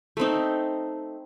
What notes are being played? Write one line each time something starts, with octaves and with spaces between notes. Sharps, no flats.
A3 C4 D#4